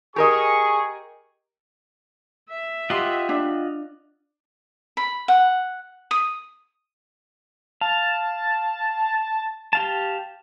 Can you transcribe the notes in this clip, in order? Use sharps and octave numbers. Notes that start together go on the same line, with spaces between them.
G4 G#4 A#4 D#5 C#6
E5
F4 G4 D#5 F#5 C6
D4
B5
F#5
D#6
F5 A5
G4 F5 A5